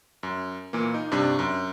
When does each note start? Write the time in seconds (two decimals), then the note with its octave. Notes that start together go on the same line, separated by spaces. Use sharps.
0.23 F#2
0.73 A#2 E3 A#3
0.94 D#4
1.12 G2 C3 D4
1.39 F#2